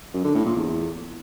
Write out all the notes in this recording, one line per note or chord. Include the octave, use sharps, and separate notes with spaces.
F#2
D3
A2
A#2
E2